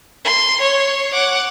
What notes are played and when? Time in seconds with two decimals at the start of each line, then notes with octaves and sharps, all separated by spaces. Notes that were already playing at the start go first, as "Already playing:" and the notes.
0.24 C6
0.61 C#5
1.13 F#5 D6